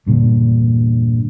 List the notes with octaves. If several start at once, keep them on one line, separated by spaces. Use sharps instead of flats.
E2 G2 A#2 D3